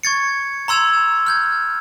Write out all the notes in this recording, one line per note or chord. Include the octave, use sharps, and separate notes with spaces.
C#6 G#6 A6 C#7
A#5 C6 E6 G#6 E7 F7
F6 G6 G#6